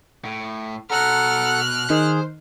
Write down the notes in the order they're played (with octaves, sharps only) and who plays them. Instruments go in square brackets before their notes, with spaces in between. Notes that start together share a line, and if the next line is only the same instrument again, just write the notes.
[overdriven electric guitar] A2
[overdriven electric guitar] B2 A#5 [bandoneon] A4 F#5 [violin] F6 F#6
[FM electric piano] D#3 D#4 [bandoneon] G#4 [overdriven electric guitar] C5